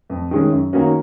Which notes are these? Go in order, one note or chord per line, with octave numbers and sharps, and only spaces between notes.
F2
D#3 G#3 C#4
F#2
D#3 A#3 C#4 F#4